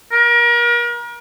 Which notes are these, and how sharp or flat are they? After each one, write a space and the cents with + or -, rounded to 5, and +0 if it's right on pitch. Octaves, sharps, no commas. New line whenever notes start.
A#4 +35